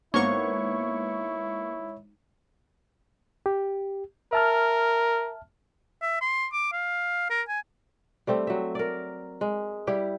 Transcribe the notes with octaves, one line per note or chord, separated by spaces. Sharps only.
G#1 A#3 B3 E4 C#5 F#5 C#6
G4
A#4 E5 A5 F6
E5
C6
D6
F5
A#4
G#5
G3 A3 C4 G4
F#3 E5
A#4 D5
G#3
G3 E4 G4